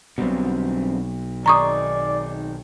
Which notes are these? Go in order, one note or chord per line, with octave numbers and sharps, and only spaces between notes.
B1 B2 D3 G3 C4
D#3 D#4 G#4 D5 A#5 C#6 D#6